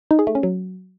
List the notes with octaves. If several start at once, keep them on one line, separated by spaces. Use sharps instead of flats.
D#4
G#4
A3
C#4
F#3